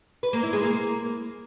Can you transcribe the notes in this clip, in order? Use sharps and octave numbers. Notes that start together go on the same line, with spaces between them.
B4
A#3
E4
G#3
A#3